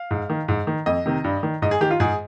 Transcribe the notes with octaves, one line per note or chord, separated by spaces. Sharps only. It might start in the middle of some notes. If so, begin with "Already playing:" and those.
Already playing: F5
G#2
D#3
G#2
D#3
F2 D#5
C3 D#3
G2
D#3
G#2 D#5
G#4
D#3 G4
F4
G#2 G#4